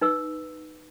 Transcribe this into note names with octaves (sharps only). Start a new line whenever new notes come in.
D#4 B4 E6